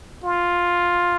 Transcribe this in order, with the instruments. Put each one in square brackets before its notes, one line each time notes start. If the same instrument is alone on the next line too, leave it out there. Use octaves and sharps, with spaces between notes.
[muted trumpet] F4